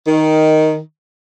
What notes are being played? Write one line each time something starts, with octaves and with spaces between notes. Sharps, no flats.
D#3